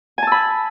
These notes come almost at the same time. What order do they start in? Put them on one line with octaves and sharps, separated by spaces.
G#5 A5 E6 B5